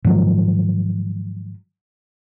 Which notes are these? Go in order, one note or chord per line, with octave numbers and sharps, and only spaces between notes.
G#2 D#3 F3 F#3